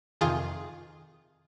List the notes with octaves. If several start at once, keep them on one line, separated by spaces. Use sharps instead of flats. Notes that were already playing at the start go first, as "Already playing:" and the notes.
F2 C3 D#3 F4 G#4